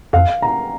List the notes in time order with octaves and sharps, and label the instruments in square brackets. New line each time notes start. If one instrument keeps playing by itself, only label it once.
[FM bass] F2 [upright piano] F5
[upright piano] A#5